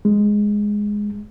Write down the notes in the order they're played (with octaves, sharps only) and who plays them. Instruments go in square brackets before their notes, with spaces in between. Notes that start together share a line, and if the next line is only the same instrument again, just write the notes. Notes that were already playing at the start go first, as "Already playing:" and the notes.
[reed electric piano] G#3